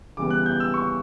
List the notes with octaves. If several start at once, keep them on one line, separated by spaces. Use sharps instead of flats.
C#3 E3 G3 B3 D6
F#6
G6
E6
C#6